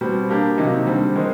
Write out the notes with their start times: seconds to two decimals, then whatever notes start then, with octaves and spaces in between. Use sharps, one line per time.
0.01 B2 G3 C4
0.29 A#3 D4 G4 A#4
0.58 C3 D#3 F#3 A#3 D#4
0.87 D3 G3 C4
1.15 D#3 G#3 C4